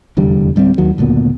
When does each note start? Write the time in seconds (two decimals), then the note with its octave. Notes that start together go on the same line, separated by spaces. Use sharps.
0.17 F1 E2 D3 G3
0.56 D1 G3 A#3 C4
0.78 D#2 D#3 F#3
0.98 F#1 D2 A#2 B3